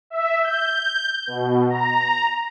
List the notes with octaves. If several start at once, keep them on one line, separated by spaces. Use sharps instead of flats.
E5
G6
B2
A#5